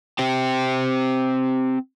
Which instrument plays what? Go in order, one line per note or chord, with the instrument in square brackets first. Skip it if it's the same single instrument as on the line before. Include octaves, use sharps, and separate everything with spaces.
[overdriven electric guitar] C4 G4